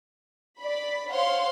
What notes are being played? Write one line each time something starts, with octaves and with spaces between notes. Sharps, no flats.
D5 B5
C5 C#5 F5 F#5 C6